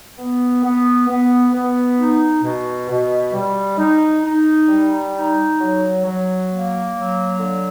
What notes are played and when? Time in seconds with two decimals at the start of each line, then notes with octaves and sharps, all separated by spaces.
0.17 B3
0.62 B3
1.08 B3
1.53 B3
1.98 D#4
2.42 B2
2.88 B2
3.33 G3
3.78 D#4
4.23 D#4
4.68 G3
5.13 D#4
5.59 F#3
6.04 F#3
6.49 A#3
6.94 F#3
7.39 D3